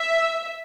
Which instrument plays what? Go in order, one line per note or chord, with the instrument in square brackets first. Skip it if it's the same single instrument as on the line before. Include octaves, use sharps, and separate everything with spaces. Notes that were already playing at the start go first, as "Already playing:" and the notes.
Already playing: [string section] E5